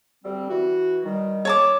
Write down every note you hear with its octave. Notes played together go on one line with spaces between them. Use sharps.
D2 G3 C4
E3 F#4
D#3 G3
C#5 A5 D6